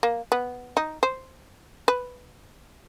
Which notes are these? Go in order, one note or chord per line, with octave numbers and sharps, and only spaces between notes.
A#3
B3
D#4
C5
B4